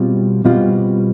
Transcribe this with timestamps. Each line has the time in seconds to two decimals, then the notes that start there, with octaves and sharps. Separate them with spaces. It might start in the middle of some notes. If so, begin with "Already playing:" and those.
Already playing: B2 G3 C4 F4
0.45 B2 G3 C4 F4